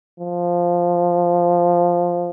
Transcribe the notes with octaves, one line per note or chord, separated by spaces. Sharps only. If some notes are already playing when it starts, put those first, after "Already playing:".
F3